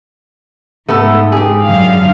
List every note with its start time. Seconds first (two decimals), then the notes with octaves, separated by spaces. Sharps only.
0.88 G#2 A3 B3 A4
1.32 G4 G#4
1.63 F#2 D3 F5